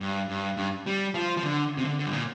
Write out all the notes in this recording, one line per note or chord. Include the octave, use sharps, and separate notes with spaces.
G2
G2
G2
G3
F3
F3
D3
C3
D3
D3
G2
A#2